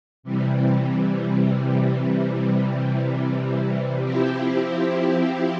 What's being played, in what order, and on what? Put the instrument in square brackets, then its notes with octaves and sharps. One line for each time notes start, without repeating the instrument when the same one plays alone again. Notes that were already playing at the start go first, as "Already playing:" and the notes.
[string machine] C3 E3 G3
F3 C4 E4 G4